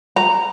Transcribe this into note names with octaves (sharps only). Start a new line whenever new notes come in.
A#5